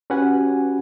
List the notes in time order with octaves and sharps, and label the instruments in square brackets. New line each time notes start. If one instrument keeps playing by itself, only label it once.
[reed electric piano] C#4 F#4 G4 B4 F#5 G#5